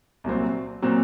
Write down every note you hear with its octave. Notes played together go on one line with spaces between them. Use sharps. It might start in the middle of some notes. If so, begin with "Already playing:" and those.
C2 A#2 F#3 C4
A#2 F#3 C4